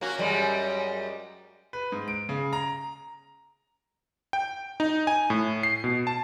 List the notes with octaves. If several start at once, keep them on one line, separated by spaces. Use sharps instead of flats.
A#3 C#4 F#4
F#2 G3 G#3
B4
G#2
D7
C#3
A#5
G5
D#4
G#5
A2
C7
B2
A5